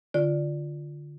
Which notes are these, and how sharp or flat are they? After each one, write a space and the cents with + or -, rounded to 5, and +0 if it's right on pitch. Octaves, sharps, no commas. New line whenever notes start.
D3 +0 F4 +0 D5 +0